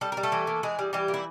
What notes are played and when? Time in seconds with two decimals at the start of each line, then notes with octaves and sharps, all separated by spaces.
0.01 G3 A4
0.12 A#4
0.17 G3
0.23 A3 A4
0.32 E3
0.47 A#3
0.63 E3 G#3 G#4
0.79 G3
0.93 E3 G3 G4
1.08 A#3
1.14 E4